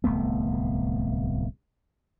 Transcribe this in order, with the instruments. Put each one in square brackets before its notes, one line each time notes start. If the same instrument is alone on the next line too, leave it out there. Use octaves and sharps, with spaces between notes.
[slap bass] D1 C2 A3 B3